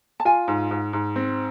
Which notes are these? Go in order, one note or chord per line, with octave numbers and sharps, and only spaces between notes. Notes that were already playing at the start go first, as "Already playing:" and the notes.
A5
F4 G#5
G#2
G#2
G#2
C4